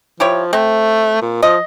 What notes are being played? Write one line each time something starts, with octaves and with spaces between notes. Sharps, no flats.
F3 E4 G4 C#5
A3 C4
A#2
F3 D#5